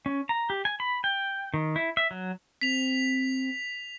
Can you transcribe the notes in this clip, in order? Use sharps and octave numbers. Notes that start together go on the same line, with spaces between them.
C#4
A#5
G4
G#5
B5
G5
D#3
E4
E5
F#3
C4 B6 F7